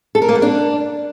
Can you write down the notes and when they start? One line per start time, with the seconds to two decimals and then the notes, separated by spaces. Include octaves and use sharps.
0.15 A4
0.22 A#4
0.29 A#3
0.35 B3
0.42 D4